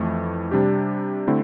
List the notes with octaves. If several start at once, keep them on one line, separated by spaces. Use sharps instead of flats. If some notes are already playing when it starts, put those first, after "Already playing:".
Already playing: F2 E3 A3
C3 G3 D4 G4
D3 A3 C4 E4